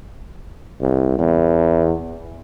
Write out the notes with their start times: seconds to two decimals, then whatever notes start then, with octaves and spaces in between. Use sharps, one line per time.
0.81 C2
1.19 E2